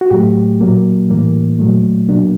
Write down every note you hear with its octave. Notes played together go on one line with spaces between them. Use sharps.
F#4
A2 F#3 A3 G4
A#2 F#3 A#3
A2 E3 G3 A#3
A#2 F#3 A3
B2 F#3 A#3 D4